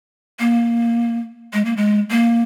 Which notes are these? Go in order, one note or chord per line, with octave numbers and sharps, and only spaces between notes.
A#3
G#3
A#3
G#3
A#3